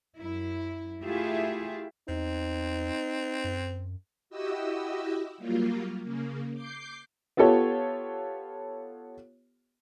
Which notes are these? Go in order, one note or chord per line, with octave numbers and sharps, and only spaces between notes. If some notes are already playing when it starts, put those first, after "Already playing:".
F#2 E4
A3 E4 F4 G4 G#4 E5
E2 C4 D#4
F#2
E4 F#4 G4 D#5 E6
F#3 G3 A#3 F4
C#3 A#3
D6 G6 C7
B3 F4 G4 A4 C#5